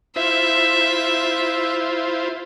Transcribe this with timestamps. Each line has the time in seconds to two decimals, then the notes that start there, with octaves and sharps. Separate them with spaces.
0.16 E4 F4 C5 E5